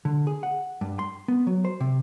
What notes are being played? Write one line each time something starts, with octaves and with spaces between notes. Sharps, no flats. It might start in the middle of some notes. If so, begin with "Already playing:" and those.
D3
G#4
F#5
G2
C6
B3
F#3
C5
C3